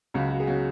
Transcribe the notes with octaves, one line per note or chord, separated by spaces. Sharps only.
C#2 C#3 F#3 F#4
F#4
G#4
C#3 F#3 F#4